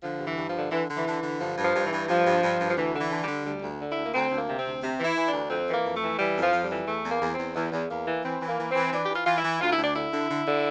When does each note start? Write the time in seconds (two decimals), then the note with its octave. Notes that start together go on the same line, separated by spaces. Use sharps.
0.03 D3 F3
0.20 G2
0.26 E3
0.37 G2
0.49 F3
0.55 D3
0.71 D3 E3
0.89 D3
0.96 E3
1.06 D3
1.23 D3
1.40 G2 F3
1.58 G2
1.64 F3
1.75 G2
1.86 E3
1.91 G2
2.08 G2 F3
2.25 G2
2.43 G2
2.59 G2
2.69 F3
2.76 D2 E3
2.93 D3
3.00 E3
3.11 D3
3.23 D3 G3
3.45 D2 G3
3.62 D2
3.80 D3
3.91 D2 E4
4.04 A#3
4.14 D2 C4
4.30 D2
4.37 A#3
4.48 C3
4.59 C4
4.65 D2
4.82 C3
4.99 E3
5.04 E4
5.16 E3
5.27 D4
5.33 D2
5.50 F2 C4
5.68 E3 A#3
5.84 F2
5.96 A3
6.01 E3
6.18 E3 G3
6.36 F2
6.42 F3
6.52 F2
6.64 G3
6.71 E3
6.87 E2 A3
7.04 E2
7.10 A#3
7.21 E2
7.33 E2 C4
7.55 E2
7.72 E2
7.90 E2 A#3
8.06 E3
8.24 E3 C4
8.40 E3
8.47 A#3
8.58 E3
8.70 C4
8.75 E3
8.92 E3 D4
9.06 E3 G4
9.15 F4
9.26 E3 F4
9.38 E4
9.44 E3
9.61 D2 F4
9.73 D2 E4
9.83 D4
9.95 D3 E4
10.12 D3
10.29 D3
10.46 D3